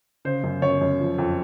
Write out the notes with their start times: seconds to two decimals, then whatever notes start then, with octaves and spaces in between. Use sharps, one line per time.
0.25 C#3 C5
0.44 F#2
0.62 F#2 C#5
0.81 F#2
0.99 F3
1.18 F2